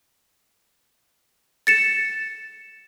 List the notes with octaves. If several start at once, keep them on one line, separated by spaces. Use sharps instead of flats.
A6 C#7 E7